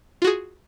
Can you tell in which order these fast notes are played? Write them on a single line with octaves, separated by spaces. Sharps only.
F4 F#4 G#4